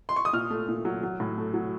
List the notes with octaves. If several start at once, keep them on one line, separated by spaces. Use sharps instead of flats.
C6
C#6
D#6
A#2 F6
A3
A#2
F#3
F#3
A2
A3
F#3